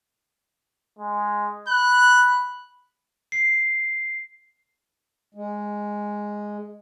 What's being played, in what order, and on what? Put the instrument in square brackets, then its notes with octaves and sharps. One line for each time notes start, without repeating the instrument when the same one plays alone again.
[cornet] G#3
[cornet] B5 [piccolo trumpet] F#6
[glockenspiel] C7
[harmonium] G#3